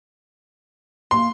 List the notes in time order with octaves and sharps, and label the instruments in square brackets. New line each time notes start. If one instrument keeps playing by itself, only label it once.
[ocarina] A#3 [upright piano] C6